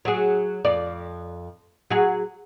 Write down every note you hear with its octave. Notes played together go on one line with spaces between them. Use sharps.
F#3 G#4
F2 D5
F#3 G#4